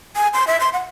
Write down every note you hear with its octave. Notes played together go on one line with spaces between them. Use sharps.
G#5
C6
E5
C6
F#5